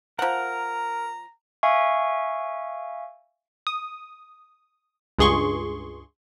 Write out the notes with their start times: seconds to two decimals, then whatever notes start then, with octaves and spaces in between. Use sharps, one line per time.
0.19 F3 A#4 F#5 A#5
1.63 E5 F5 G#5 C#6
3.67 D#6
5.19 C#2 G2 G#4 C6 C#6